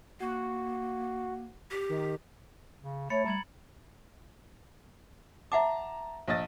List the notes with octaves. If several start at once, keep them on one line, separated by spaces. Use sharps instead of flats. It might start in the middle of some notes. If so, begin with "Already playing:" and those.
A#3 F#4
G4
D#3
C#3
A3 C#5 B5 A6 C#7
G3 A#5 G#6 F#7
E5 F#5 A5 A#5 D6
A#1 D#5 A6